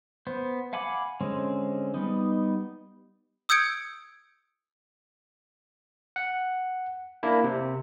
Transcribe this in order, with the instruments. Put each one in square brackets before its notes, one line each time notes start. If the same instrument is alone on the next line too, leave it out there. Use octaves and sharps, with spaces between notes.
[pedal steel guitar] B3 C5
F5 F#5 G#5 B5 D6
D3 G#3 C4 C#4
G3 B3 D#4
[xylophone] D#6 E6 G6 G#6 C#7 D7
[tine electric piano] F#5
A#3 D4 E4
C3